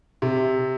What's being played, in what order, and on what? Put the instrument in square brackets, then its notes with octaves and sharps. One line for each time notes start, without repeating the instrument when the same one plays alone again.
[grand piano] C3